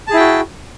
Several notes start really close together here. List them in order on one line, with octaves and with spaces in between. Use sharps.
A5 G#4 E4 G5 F#4